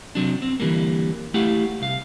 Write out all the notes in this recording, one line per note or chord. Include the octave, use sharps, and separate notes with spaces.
C3 F#3 D4
C4
D3 E3 F3 G3 A#3
A3 E4 G4 F5 F#5
C2 F5